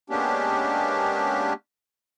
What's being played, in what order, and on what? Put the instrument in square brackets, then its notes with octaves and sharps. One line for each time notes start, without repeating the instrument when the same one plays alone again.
[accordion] G#3 A#3 B3 C#4 D4 G4